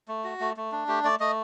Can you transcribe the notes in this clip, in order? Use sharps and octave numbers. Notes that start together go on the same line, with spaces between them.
A3
F#4
A3
A3
D4
A3 G4
A3 D5
A3 D#5